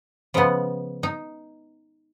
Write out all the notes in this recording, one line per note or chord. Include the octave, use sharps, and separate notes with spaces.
C#3 F3 G#3 B3
D#4